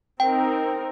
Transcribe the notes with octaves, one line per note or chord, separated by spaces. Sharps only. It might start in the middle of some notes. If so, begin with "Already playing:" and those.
C4 D#4 A#4 G5